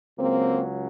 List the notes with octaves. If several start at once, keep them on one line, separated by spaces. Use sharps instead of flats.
C#2 C#3 F#3 A#3 C4